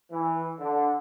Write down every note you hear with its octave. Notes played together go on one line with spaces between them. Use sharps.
E3
D3